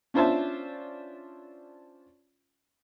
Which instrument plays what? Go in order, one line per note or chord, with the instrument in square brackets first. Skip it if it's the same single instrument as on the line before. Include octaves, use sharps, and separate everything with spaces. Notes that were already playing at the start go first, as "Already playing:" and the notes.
[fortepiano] C#4 D4 F4 C5 E5 A5